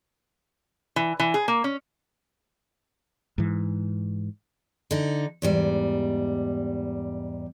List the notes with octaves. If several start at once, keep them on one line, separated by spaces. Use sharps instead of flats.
E3
E3
G#4
A#3
C#4
G#2 E3
D3 D#4
E2 G#2 G3